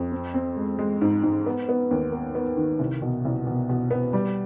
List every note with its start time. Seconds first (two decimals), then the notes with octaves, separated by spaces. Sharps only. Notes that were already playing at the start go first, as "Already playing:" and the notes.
Already playing: F2
0.12 C4
0.34 C4
0.57 G#3
0.79 G#3
1.01 G#2
1.23 G#2
1.46 B3
1.69 B3
1.91 D#2
2.12 B3
2.35 B3
2.57 D#3
2.79 C2
3.02 B2
3.25 C2
3.47 B2
3.69 B2
3.91 B3
4.13 G3